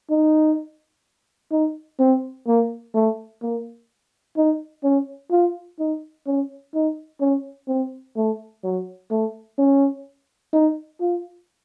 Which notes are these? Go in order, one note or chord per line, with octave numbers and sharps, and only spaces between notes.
D#4
D#4
C4
A#3
A3
A#3
D#4
C#4
F4
D#4
C#4
D#4
C#4
C4
A3
F#3
A3
C#4
D#4
F4